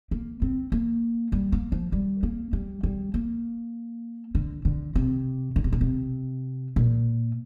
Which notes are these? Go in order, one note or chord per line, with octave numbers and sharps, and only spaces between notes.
A#3
C4
A#3
G3
A#3
F3
G3
A#3
G3
G3
A#3
D3
D3
C3
D3
C3
A#2
C3
A#2